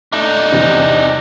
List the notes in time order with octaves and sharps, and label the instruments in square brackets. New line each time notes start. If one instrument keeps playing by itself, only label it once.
[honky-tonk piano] A3 [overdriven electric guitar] D4 D#4
[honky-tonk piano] E2 C3 G3